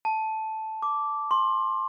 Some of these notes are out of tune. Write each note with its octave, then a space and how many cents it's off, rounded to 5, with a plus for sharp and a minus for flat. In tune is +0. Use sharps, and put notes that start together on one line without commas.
A5 -5
D6 -10
C6 +20